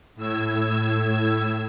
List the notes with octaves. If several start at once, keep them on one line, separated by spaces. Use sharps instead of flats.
A2 E6 G#6